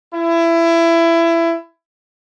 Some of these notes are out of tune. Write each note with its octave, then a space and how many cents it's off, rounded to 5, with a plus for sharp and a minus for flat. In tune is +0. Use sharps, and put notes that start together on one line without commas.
E4 +20